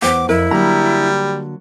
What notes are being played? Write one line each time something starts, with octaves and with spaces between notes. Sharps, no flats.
E2 B3 C5 F#5 D6
F2 E4 A#4
D3 F#3 G3 A#3 A#5